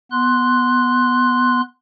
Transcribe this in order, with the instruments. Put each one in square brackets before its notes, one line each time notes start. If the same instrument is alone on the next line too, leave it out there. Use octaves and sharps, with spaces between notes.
[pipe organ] B3 C6 F#6